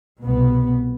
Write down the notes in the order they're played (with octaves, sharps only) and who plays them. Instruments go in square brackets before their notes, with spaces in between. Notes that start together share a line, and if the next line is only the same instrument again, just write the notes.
[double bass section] C2 B2 B3